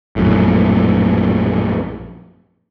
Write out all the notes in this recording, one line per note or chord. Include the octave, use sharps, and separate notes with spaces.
A#1 F#2 A2